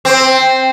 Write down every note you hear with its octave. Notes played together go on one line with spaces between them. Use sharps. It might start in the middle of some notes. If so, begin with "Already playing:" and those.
C4